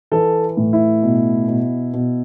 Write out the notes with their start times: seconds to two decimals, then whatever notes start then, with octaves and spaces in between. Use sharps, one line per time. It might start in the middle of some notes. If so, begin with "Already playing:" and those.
0.11 E3 A4
0.57 A2
0.73 E4
1.02 B2
1.48 B2
1.94 B2